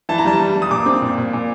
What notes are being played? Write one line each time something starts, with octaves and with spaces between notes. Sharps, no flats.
E3 A5
A#5
G3 A5
G3
G3
D#6
A#2 D6
C4
A#2
A#2
A#2